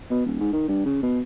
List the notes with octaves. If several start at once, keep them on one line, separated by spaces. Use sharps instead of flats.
B2
D#1
G#2
D#3
G2
C#3
B2